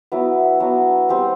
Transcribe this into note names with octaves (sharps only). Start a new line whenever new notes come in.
F#3 B3 E4
F#3 B3 D4
G3 C4 G4